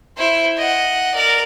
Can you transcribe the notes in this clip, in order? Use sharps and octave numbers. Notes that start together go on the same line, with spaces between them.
E4 C5
D#5 F#5
A#4 D5